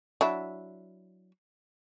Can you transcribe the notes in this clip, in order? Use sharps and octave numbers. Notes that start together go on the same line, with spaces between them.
F#3 D4 E4